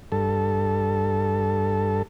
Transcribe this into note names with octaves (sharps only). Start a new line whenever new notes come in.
G2 A4